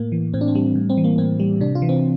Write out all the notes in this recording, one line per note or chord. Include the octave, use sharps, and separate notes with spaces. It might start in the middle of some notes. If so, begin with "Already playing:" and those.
Already playing: A2 A#3
E3
A2 C4
D4
C4
G3
A2
C4
E3
A#3
A2 C4
G3
C3 D4
F4
E3
C4